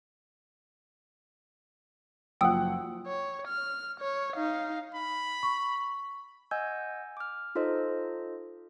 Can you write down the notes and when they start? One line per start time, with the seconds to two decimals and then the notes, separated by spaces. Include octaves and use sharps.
2.41 F#1 F3 F#5 G5 D#6 E6
3.07 C#5
3.47 F6
4.00 C#5
4.36 D#4 F5
4.95 B5
5.43 C#6
6.51 D#5 F#5 G#5 E6 G6 G#6
7.17 D6 F6
7.55 D#4 F4 A4 C5 D#5